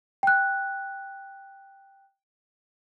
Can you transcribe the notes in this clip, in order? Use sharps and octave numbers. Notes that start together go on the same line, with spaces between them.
G5 F#6